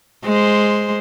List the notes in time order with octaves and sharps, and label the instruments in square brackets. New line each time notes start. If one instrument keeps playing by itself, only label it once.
[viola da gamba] G#3 C5